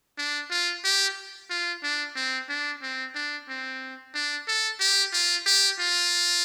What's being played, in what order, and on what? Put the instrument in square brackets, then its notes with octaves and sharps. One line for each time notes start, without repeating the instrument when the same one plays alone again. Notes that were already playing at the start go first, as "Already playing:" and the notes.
[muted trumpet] D4
F4
G4
F4
D4
C4
D4
C4
D4
C4
D4
A4
G4
F4
G4
F4